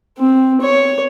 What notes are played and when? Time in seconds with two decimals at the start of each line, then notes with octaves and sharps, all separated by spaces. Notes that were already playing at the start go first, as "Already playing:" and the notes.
0.19 C4
0.61 C#5